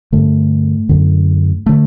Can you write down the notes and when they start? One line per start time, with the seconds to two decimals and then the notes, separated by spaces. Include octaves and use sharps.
0.12 G2 D3 A3
0.89 F#2 D3
1.66 D3 A3